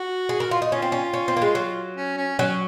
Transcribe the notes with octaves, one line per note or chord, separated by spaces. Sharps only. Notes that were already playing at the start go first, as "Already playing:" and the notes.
Already playing: F#4
G#4
A#4
F4
D#4
C#4 F4
C4
C#4
C#4
C4
A#3
G#3
F#3
C#4
C#4
F#3 C#4